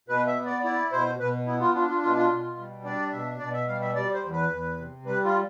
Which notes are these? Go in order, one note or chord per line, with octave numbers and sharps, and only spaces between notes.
B2 B4
E5
B3
D5
E4 D5
B2 C5
B2 B4
B3 E4
F4
D4 F4
F4
B2 F4
F4
B2
G3
D4 D5
B2 E5
B2 D5
E5
G3 F5
E5
G3 D5
C5
E2
B4
E2
C3
G3 B4
F4